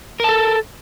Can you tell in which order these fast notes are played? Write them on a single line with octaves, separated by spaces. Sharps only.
A#4 A5 A4